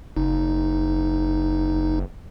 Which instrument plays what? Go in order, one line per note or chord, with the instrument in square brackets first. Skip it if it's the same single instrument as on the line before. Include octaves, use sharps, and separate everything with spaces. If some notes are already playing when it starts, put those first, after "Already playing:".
[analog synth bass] F#1 [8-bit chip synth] D#4